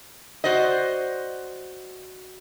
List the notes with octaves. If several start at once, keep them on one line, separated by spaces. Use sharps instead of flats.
F#4 C5 D5 D#5